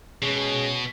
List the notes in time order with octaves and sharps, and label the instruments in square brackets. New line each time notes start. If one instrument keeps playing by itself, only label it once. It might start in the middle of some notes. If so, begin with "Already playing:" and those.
[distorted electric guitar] B2 [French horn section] G#3 C#4 G#4